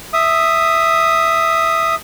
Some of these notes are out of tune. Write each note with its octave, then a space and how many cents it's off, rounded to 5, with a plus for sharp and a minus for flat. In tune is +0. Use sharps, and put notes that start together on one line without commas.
E5 +0 D#6 +0